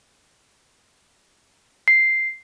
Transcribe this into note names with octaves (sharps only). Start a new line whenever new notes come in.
C7